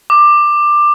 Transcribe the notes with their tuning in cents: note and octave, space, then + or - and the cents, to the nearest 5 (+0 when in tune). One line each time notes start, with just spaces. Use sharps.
D6 +15